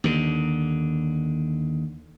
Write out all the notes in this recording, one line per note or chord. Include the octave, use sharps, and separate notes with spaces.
D#2 D3